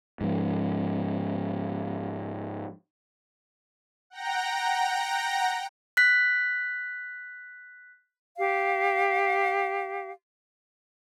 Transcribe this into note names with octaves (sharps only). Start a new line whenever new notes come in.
G#2 F3
F#5 G5 A#5 A#6
F#6 B6
G4 F5